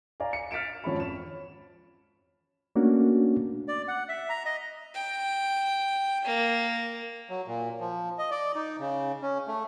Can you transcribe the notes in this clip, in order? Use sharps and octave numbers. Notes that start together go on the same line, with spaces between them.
D5 F5 G#5 A#5
C#7
F6 A6 B6 D7 E7
G#1 F2 C#4 B5
E7
A3 A#3 C#4 D4 F#4
D5
F#5
E5
A#5
D#5
G5
A#3
F#3
A#2
F3
D#5
D5
D#4
C#3
C#4
A3